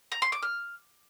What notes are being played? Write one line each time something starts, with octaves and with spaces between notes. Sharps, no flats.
A#5
C6
D6
F6